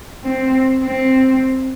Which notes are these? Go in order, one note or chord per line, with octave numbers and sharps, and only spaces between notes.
C4
C4